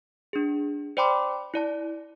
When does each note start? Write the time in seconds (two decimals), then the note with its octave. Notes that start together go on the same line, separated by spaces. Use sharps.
0.33 D4 G#4
0.97 C5 D5 G5 B5 C6 D6
1.54 E4 D5 A5